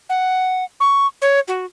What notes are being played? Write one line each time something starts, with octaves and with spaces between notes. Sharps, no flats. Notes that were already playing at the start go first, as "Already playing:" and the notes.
F#5
C#6
C#5
F#4